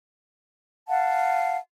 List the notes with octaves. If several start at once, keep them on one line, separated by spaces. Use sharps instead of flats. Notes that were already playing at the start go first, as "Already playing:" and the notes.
F5 F#5 A5